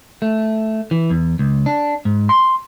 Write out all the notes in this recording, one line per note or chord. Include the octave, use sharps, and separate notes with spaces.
A3
E3
E2
C#2
D4
G#2
C6